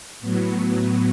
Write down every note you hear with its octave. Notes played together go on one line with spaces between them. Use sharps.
A2 F#3 B3